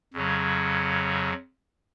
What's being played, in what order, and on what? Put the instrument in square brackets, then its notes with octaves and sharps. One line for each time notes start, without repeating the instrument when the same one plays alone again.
[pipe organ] F2 C#3 F#3